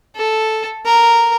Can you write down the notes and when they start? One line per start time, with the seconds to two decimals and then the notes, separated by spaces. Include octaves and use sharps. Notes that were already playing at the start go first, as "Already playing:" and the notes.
0.16 A4
0.86 A#4